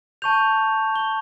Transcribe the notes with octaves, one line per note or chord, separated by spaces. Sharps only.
A5 C#6 G6 F7
G7